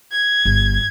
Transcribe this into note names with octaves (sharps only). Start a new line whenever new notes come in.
G#6
G1